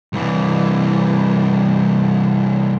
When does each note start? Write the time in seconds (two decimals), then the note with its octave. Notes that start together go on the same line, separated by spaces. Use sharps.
0.13 C2 E3